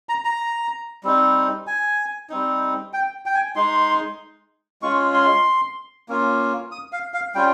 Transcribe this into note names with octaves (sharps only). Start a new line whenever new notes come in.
A#5
A#5
G3 C4 D#4
G#5
G3 C4 D#4
G5
G5
G#5
G#3 D#4 C6
G#3 C#4 F4 C#6
C6
A#3 C#4 F4
D#6
F5
F5
G3 C#4 F4 G5